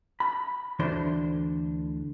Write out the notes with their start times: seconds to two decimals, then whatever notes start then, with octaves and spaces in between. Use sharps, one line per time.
0.20 B5
0.79 D2 E3 A3 D4 C5 C6